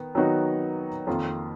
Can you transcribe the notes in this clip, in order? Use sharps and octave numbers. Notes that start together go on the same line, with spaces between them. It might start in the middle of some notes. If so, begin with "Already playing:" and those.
Already playing: D#3 B3
D#3 F#3 B3 D#4 F#4
F2 D#3 A#3 F4